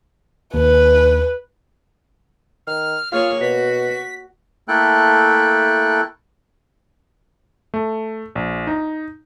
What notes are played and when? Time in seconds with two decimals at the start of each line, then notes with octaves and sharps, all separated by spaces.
0.54 D#2 B4
2.67 D#3 F6
3.12 A#3 F4 G#4 C#5 F6
3.41 B2 F#4 B6
4.68 A3 A#3 E4 A4 G5 F#6
7.74 A3
8.35 A#1
8.67 D#4